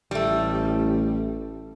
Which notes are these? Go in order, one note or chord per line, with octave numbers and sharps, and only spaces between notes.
A1 G3 A3